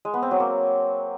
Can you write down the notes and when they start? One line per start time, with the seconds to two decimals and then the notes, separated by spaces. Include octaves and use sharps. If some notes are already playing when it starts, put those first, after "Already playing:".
0.05 G#3
0.14 B3
0.22 C4
0.31 F#3
0.40 A#3